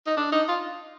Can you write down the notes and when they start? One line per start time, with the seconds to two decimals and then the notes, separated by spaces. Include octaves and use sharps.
0.07 D#4
0.17 D4
0.32 D#4
0.48 F4